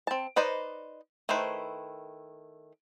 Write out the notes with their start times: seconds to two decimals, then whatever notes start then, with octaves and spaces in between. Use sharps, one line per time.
0.07 C4 A5
0.36 D#4 B4 C5 D5 D#5
1.29 D#3 A3 E4 B4 C5